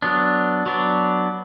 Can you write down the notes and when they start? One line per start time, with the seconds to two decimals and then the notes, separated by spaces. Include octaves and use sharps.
0.02 F#3 B3 D4
0.66 F#3 B3 D4